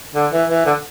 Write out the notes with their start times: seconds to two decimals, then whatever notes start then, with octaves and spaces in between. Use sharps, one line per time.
0.15 D3
0.32 E3
0.50 E3
0.66 D3